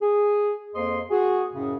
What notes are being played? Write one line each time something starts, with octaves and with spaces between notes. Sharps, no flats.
G#4
F2 A#3 C5 D#5 C6
F#4 G#4
F#2 A2 C#3